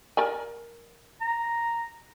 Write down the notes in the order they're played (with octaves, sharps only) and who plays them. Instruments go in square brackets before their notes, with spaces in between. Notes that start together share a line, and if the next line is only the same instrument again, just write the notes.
[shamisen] A#4 D5 G#5
[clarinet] A#5